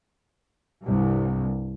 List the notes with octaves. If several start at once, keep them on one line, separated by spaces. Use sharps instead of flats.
C2 G2